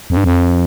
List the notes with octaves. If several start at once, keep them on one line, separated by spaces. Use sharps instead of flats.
F2
G2
F2